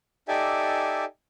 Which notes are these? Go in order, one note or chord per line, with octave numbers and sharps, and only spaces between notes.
D#4 G4 A4 D5 E5 G#5